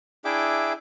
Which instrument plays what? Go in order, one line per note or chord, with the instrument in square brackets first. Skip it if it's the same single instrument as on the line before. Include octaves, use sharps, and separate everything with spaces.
[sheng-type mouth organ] D4 E4 G#4 E5 G5 D6